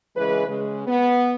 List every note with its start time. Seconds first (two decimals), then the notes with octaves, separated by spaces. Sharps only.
0.16 C#3 E3 G#3 B4
0.47 C#3 G#3
0.87 B3